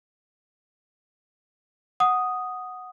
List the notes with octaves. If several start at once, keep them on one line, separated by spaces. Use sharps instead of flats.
F#5 D#6